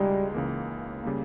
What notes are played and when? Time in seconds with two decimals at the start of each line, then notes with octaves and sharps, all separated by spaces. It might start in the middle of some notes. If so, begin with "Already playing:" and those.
Already playing: C#2 B2 G3 G#3 D#4
0.34 C#2 C#3 E3 A#3
1.03 C#3 G3 A#3